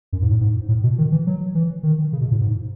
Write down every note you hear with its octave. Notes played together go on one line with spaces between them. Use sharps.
F#2
G#2
A2
G#2
A2
B2
D#3
E3
F#3
E3
D#3
C#3
B2
A2
G#2